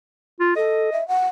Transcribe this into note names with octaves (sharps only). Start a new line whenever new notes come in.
F4
A4 D#5
E5
F#5